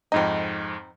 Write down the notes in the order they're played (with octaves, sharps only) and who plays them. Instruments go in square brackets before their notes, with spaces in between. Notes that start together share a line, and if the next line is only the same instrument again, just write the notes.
[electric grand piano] F2 G#2 D#5 [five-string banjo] C4 D#4